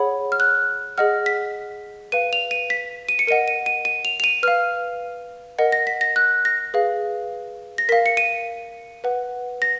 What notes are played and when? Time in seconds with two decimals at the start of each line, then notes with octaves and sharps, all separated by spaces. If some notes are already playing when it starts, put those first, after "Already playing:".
Already playing: G#4 C#5 F#5 B5
0.32 F6
0.40 F#6
0.98 G#4 D#5 F#5 F6
1.26 B6
2.12 B4 F5 D#7
2.33 F7
2.51 D#7
2.70 B6
3.09 D#7
3.19 C#7
3.27 A#4 D#5 F#5 D#7
3.48 D#7
3.66 D#7
3.85 D#7
4.05 F7
4.20 F7
4.24 D#7
4.43 B4 F5 F6
5.59 A#4 D#5 F#5
5.72 A#6
5.87 B6
6.01 A#6
6.16 F#6
6.45 A#6
6.74 G#4 B4 F5
7.78 A#6
7.89 A#4 F5 B6
8.06 C#7
8.17 D#7
9.04 B4 F#5
9.62 A#6